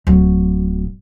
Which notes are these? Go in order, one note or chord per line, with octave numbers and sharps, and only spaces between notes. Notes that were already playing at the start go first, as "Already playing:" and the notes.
D1 F#3